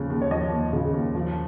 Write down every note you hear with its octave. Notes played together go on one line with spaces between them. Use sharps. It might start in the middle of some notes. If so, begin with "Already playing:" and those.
Already playing: D#2 C#3 F3
D#2
C#5
F3 D#5
D#2
C#3
D#2
F3